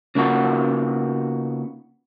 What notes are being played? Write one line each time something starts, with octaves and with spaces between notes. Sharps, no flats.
C#3 A#3 B3 D#4 F4 F#4